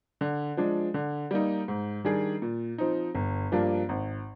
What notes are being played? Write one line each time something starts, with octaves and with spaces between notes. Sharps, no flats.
D3
F3 G#3 D4
D3
G3 A#3 D#4
G#2
D#3 G3 D4 G#4
A#2
F3 C4 D#4
G1
G2 F3 A#3 D4
G#1